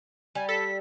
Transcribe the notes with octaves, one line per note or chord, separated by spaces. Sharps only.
G3 G#5
A4 B6